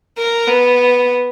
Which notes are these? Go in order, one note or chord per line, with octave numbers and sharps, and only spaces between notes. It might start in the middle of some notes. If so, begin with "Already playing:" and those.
A#4
B3